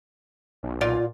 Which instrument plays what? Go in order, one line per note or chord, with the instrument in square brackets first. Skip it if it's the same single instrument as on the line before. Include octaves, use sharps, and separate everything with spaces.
[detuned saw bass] B1
[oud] A#2 F4 D5